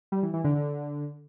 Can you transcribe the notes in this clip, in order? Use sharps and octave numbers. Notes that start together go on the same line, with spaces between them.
G3
E3
E3
D3
D3